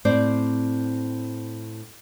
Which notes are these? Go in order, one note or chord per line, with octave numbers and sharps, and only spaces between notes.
A2 C4 C5 D5